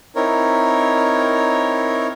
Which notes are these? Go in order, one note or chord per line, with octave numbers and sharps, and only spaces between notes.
C4 D#4 E4 A#4 C#5